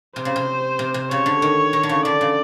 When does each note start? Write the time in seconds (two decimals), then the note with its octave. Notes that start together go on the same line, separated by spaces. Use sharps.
0.16 C3 C5
0.25 C#3
0.36 C3
0.79 C3
0.94 C3
1.10 C#3 C#5
1.26 D3
1.42 D#3
1.73 D#3
1.83 D3
1.89 C#3
2.05 D3 D5
2.21 C#3